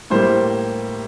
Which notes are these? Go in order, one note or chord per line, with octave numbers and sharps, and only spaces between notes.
A2 G3 A#3 C5